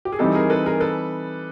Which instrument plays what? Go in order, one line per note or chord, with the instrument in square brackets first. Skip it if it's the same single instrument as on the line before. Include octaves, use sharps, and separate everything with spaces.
[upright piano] G4
G#4
[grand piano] E3 G3 C4 D#4 [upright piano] G4 A4
[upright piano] G#4 A#4
A4 B4
G#4 A#4
A4 B4